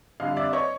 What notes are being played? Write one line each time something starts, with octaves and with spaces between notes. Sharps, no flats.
F2 D3 G3 D#5 F5
D5 E5
C#5 D#5